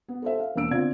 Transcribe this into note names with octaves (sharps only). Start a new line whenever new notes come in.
B3
A4 C5 E5
F5
E1 A#3 D4 E6 D7
D3 B3 C4 F4 D5 G#6